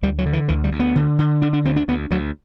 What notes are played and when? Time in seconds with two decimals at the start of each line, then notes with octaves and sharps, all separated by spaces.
0.02 D2 G3
0.18 F#3
0.26 D3
0.33 E3
0.48 D2 E3
0.64 G3
0.72 D2
0.80 B3
0.96 D3
1.19 D3
1.42 D3 D4
1.53 D4
1.65 D2 C4
1.76 D4
1.88 D2 B3
2.11 D2 F#3